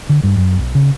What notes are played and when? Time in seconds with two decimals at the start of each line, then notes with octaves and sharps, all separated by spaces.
0.09 D3
0.23 G2
0.36 F#2
0.57 B1
0.75 C#3